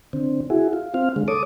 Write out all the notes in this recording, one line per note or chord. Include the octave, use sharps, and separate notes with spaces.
D3 C4
E4 F#4 G#4
F4
C4 F5
D3 G#3
A4 C#5 D6 D#6